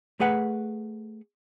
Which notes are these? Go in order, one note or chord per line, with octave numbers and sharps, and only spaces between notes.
A3 G#4 B4 F#5